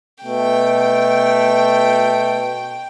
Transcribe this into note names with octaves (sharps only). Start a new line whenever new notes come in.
B2 A3 G5